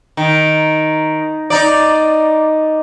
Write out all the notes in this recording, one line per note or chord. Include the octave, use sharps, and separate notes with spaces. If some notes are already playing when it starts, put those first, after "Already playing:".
D#3
D#4 D5